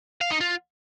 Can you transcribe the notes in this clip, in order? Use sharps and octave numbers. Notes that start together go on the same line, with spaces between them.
F5
D#4
F4